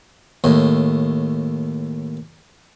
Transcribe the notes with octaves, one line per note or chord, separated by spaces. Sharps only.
D#2 A2